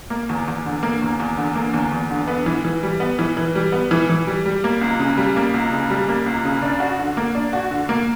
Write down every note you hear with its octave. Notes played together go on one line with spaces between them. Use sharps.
A#3
E2
E2
D3
A#3
E2
E2
D3
A#3
E2
E2
D3
B3
E3
E3
G3
B3
E3
E3
G3
B3
E3
E3
G3
G3
A#3
C#2
C#3
G3
A#3
C#2
C#3
G3
A#3
C#2
C#3
D4
F#4
D3
A#3
D4
F#4
D3
A#3